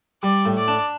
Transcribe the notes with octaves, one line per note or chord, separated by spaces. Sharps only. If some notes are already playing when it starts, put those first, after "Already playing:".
G3 D5
A2
D5
D4